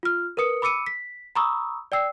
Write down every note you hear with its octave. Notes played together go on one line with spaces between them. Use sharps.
F4 F6
A#4 B4 D#6 C#7
B5 D6 E6 C#7 D#7
B6
A#5 B5 C#6 D#6 E6
D5 G5 E6 C7